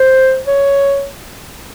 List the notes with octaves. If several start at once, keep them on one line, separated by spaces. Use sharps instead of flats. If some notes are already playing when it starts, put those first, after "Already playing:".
Already playing: C5
C#5